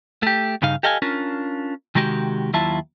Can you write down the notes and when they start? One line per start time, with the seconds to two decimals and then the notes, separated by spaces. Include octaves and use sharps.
0.23 A3 G4
0.62 G2 C#3 D#4 F5
0.83 G4 A4 D#5 F5 F#5 G#5
1.02 C#4 D4 F4 A#4
1.95 C3 D#3 G#3 F#4 G4
2.53 D#2 F#3 E4 F4 E5 A5